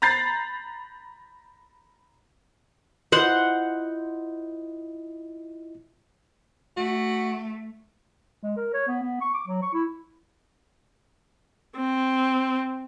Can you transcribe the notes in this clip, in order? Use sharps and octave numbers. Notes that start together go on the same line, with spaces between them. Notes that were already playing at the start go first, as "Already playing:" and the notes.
A#5 B5 G6 A6 C7
E4 F4 C5 D#5 F#5
A3 F#4
G#3
A#4
C#5
B3
B3
C#6
D6
F#3
C#6
E4
C4